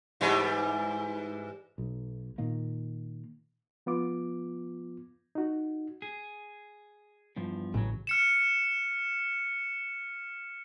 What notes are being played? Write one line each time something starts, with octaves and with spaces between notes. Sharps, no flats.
G#2 E3 G3
B1
A#2 D#3 A#3
F3 B3 F4 D6
D#4 F#4
G#4
E2 G2 F3
A1 A2 C#3 E3 F#3
F6 C#7 E7